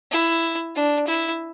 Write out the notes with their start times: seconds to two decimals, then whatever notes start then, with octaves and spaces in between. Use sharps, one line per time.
0.11 E4
0.75 D4
1.07 E4